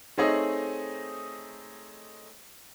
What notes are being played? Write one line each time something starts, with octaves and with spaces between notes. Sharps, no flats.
A3 C4 D#4 G#4 C#5 D#5